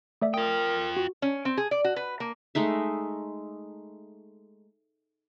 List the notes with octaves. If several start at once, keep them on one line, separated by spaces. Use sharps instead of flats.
A3 D5 E5
F4 A#4 G5 D#6
F#4
C#4
C4
G#4
D5
F#4
B4
A#3
G#3 A3 D#4 E5